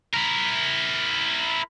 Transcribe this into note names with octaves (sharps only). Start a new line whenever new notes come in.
E4 A#4